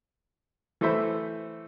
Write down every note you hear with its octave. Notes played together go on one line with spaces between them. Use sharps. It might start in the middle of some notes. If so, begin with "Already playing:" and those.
E3 A3 A4 C5 E5 B5